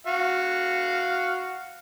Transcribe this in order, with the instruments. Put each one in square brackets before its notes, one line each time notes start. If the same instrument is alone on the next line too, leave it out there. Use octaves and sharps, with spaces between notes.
[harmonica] F#4 F5